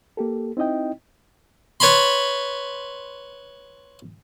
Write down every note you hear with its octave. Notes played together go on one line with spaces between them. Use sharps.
A#3 G4 A4
C4 D#4 E4 D#5 G5
B4 C#5 A5 B5 C6